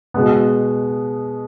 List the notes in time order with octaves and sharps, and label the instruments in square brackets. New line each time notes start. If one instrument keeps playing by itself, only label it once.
[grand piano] B2 G#3 B3